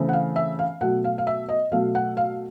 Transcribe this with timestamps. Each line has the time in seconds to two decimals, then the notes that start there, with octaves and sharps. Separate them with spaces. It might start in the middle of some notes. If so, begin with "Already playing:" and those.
Already playing: C#3 E3 A3 C4
0.09 F#5
0.13 F5
0.36 E5
0.59 F5
0.81 B2 F#3 A3 F#5
1.04 F5
1.18 F5
1.27 E5
1.49 D#5
1.71 B2 F#3 A3 F5
1.95 F#5
2.17 F5